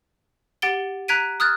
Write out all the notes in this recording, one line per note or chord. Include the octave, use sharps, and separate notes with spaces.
G4 F#5 A6 D7 G7
A#5 F#6 G#6 B6 D7 D#7
D#6 F6 F#6 G#6 A6